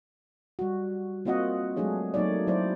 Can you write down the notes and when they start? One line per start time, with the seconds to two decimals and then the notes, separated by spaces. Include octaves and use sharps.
0.59 G3 F#4
1.25 A#3 C4 F4 F#4 D#5 F#5
1.76 F#3 G#3 A3 D4 G#4 C#5
2.14 F#3 A3 A#3 D#4 C#5 D5
2.47 F#3 E4 C5 D5